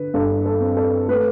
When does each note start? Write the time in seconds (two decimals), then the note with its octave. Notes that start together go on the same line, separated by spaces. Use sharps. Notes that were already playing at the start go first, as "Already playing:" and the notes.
Already playing: D3 B4
0.14 G2 A4
0.46 A4
0.61 C4
0.77 A4
1.08 A3 B4